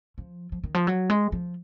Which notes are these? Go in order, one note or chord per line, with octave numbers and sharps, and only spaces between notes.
F3
F3
D#3
F3
F#3
G#3
F3